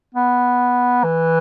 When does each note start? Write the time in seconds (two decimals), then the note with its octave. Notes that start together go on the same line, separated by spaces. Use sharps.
0.15 B3
1.04 E3